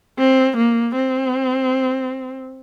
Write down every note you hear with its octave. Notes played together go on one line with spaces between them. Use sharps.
C4
A#3
C4